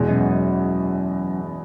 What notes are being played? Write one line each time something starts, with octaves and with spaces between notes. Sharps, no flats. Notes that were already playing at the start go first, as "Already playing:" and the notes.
Already playing: E2 B2 G#3
F#2